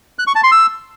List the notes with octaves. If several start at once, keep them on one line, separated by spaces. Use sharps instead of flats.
F#6
C#6
A5
C6
E6